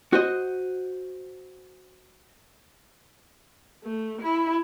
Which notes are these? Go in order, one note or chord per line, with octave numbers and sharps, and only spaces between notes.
F#4 C5 D#5
A3
E4